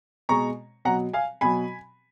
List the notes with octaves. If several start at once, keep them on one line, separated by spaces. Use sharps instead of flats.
B2 G#3 A#5 C#6
B2 F#3 F#5 A#5
F5 G#5
B2 F#3 G#5 B5